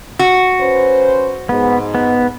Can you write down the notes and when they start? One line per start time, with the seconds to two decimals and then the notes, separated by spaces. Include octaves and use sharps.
0.19 F#4
0.60 C#4 B4 C5
1.49 G#2 B3
1.95 B3